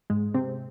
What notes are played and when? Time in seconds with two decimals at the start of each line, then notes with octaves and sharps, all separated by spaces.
0.10 G#2 G#3
0.34 C3 C4